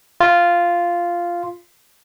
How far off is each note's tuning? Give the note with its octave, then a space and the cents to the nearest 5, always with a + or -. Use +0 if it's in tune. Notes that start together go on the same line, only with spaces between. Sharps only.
F4 -5